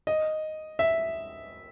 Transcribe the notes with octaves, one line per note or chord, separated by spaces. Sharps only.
D#5
E5